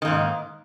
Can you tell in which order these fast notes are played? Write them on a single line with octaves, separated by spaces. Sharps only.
D#3 A#3 G#2